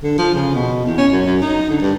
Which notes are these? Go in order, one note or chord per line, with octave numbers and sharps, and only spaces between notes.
D3
F3
C#3
B2
E2
C#4
F#2
F#2
D#4
D3
G2